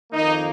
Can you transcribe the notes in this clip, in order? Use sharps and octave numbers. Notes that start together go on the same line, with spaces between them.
F2 D#3 A#3 D#4